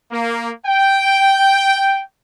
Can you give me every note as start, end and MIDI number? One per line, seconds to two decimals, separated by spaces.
0.11 0.50 58
0.66 2.03 79